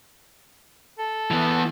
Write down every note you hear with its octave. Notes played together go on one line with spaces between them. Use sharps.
A4
E3 B3